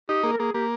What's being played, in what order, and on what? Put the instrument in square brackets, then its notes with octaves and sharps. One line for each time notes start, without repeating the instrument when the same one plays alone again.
[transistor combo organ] D#4 [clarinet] G4
[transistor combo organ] A#3 [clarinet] G#4
[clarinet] A#4
[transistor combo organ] A#3 [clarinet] G#4
[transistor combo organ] A#3 [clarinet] G4